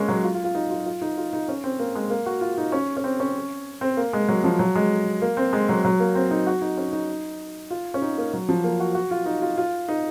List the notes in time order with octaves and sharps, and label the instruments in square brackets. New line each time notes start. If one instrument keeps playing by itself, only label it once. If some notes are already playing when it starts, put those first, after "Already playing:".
Already playing: [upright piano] G#3 A#3 C#4
F#3
F4
F4
F4
D#4
F4
F4
D#4
F4
D#4
C#4
C4
A#3
G#3
A#3
F#4
F4
D#4
C#4
C#4
C4
C#4
C4
A#3
G#3
F#3
F3
F#3
G#3
A#3
C4
G#3
F#3
F#3
A#3
C4
D#4
F#4
D#4
C#4
D#4
F4
C#4
D#4
A#3
F#3
F3
A#3
F#4
F#4
F4
D#4
F4
F4
D#4